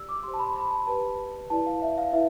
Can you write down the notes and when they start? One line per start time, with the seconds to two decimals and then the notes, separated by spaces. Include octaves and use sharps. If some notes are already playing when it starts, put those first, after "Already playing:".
Already playing: G4 D5 E6
0.09 D6
0.23 G4 C5 C6
0.34 A5
0.39 B5
0.56 B5
0.71 A5
0.87 G4 B4 D5 A5
1.50 E4 B4 D5 A5
1.66 F5
1.82 E5
1.98 F5
2.12 E4 B4 E5